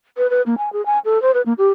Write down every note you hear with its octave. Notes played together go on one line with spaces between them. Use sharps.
B4
B4
A#3
G#5
G#4
G#5
A4
C5
B4
A#3
G4